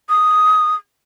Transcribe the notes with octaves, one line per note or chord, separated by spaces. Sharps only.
D#6